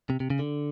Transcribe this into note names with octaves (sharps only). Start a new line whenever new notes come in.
C3
C3
C#3
D3